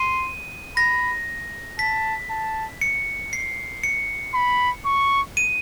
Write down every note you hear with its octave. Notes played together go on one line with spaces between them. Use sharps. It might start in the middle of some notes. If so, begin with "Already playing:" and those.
Already playing: C6 D#7
B5 A#6
A5 B6
A5
C#7
C7
C#7
B5
C#6
D#7